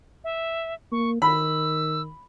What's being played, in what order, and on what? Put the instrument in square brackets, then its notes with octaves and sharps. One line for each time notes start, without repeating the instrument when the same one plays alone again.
[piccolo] E5
[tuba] A#3 [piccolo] C#6
[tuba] D#3 [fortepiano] B5 [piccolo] E6